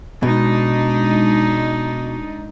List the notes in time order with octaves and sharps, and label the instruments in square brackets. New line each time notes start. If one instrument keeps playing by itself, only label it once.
[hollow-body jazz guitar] B2 [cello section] G#3 D4 D#4